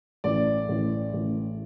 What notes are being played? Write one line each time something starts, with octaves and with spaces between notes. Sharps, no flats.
A1 D5
A1
A1